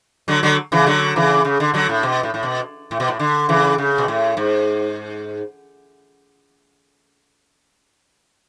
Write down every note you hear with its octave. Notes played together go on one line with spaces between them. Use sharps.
D3 F#3
D3 F#3
C#3 E3
D3 F#3
C#3 E3
C#3
D3
D3 F#3
A2
B2
A2
A2
B2
A2
B2
A2
D3
C#3 E3
C#3
B2
A2
G#2